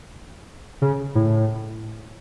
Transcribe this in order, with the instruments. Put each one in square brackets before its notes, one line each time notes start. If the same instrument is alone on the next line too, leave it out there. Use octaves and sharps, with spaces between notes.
[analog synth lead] C#3
A2